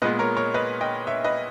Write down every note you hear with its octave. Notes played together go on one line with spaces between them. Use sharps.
A#2 G#3 B3 B4 D#5
A#4 C#5
A#4 C#5
B4 D#5
D#5 G5
C#5 E5
B4 D#5